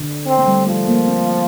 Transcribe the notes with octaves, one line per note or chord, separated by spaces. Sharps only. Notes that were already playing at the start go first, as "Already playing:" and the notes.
Already playing: D3
C4
A3
G3
F3 A3
A#3
C4